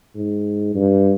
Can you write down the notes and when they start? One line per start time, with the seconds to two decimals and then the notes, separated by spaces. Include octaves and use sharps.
0.16 G#2
0.75 G2